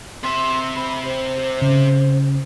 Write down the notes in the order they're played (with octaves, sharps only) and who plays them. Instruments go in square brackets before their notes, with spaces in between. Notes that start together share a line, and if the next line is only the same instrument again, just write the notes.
[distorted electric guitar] C3 E5 [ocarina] C6
[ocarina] B5
C5
[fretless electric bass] C#3